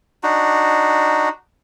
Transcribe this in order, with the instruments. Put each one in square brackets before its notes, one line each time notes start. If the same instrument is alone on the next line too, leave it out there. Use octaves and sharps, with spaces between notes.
[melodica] D4 D#4 F#4